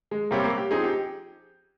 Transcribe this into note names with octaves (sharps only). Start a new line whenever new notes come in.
G#3
C3 G3 A#3 C4 G4 C#5
A#3
G4
F3 C4 D#4 G#4
G4